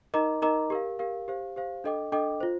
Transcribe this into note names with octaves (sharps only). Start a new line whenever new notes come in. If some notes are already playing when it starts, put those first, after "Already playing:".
D#4 A#4 D#5 A#5 D6
D#4 A#4 D#5 A#5 D6
G4 A#4 F5
G4 A#4 F5
G4 C5 F5
G4 C5 F5
D4 A4 D#5 G5 D6
D4 A4 D#5 G5 D6
F4 C5